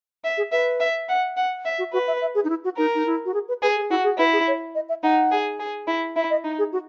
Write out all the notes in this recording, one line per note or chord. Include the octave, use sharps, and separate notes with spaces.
E5
G#4
B4 E5
E5
F#5
F#5
E5
F#4
F#4 B4
E5
E5
G#4
D#4
E4
F#4
D#4 A#4
D#4
E4
F#4
G#4
B4
G#4 B4
G#4
E4 F#4
G#4
E4 B4
G#4
C#5
D#5
E5
D#4 F#5
G#4
G#4
E4
E4 E5
D#5
D#4
G#4
F#4